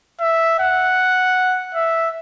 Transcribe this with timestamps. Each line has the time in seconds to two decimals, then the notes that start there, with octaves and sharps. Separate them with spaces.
0.20 E5
0.60 F#5
1.75 E5